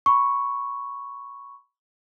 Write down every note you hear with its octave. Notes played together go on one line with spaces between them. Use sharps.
B5 C#6